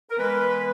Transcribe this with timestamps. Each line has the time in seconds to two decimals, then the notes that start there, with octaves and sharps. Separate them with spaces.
0.10 A#4
0.17 E3 G#3 B3 B4